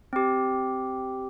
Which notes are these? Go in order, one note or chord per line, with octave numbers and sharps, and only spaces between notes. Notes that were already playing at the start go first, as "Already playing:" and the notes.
C4 G4